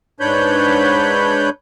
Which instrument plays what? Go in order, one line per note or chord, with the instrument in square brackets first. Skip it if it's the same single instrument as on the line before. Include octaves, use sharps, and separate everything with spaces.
[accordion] G#2 D4 B4 C#5 B5 G6